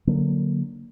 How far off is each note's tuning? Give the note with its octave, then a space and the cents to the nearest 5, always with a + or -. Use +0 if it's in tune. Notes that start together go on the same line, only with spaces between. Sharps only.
D3 -10 F#3 -5 A#3 +0